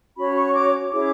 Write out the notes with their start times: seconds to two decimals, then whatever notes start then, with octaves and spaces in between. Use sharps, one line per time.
0.16 C#4 F#4 C#5 B5
0.34 C#6
0.53 D6
0.90 C#4 E4 G#4 C#5 D6